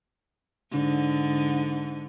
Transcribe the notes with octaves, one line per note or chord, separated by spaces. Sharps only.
G#2 D3